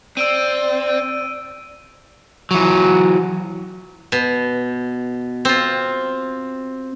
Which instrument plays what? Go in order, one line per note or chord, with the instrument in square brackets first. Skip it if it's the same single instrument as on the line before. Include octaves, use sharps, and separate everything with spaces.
[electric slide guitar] C4 [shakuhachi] D5 [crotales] E6 D7 D#7
[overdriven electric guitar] E3 F#3
[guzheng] B2
C4 F4